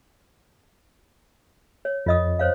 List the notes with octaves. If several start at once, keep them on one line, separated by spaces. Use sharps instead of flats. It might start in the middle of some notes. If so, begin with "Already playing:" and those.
C#5
F2 F4 D#5 D#6
C5 C#5 F5